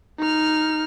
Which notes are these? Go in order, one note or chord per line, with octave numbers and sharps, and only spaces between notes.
D#4 F6